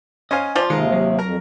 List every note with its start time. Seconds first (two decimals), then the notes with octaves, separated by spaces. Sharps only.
0.31 C#4 C5 D#5 F5 G#5
0.55 F3 F4 D5
0.70 D#2 C3 D#3 G#3 A#4
0.92 F#3
1.19 F2 A#4 A#5